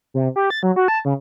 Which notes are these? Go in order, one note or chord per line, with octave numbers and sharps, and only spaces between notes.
C3
G4
A6
F#3
F#4
A5
C#3